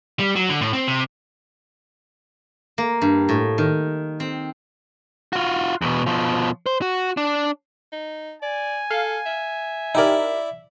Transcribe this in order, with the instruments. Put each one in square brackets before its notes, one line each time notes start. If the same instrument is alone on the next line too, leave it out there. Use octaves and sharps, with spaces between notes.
[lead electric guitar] G3
F#3
D3
A2
C4
C3
[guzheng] A#3
G2
A2
D#3
C4
[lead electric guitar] F4 F#4
E2 B2
B2 F3
C5
F#4
D4
[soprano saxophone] D#4
[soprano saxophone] D5 [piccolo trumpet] G#5
[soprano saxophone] A4 [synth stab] F5
[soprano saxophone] E5
[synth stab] D#4 G4 A#4 [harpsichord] E4 D5